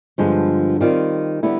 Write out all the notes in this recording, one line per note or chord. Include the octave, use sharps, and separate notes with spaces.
G2 D3 F3 G#3 B3
D#3 G3 C4 F4
D3 G3 B3 E4